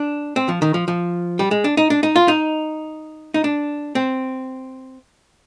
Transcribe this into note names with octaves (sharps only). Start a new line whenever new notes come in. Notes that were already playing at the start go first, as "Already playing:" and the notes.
Already playing: D4
C4
F3
D#3
F3
F3
G3
G#3
D4
D#4
D4
D#4
F4
D#4
D#4
D4
C4